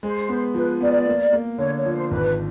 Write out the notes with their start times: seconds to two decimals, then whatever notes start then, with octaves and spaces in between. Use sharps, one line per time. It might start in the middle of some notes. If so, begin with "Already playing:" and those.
0.03 G#3 C5
0.29 B3
0.54 F3 B4
0.81 B3 D5
1.07 A#3
1.33 A#3
1.58 D3 C#5
1.77 C#5
1.85 F3
1.93 C5
2.11 G#1 B4